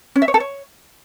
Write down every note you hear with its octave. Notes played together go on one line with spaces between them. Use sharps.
C#4
E5
C#5
A4
C#5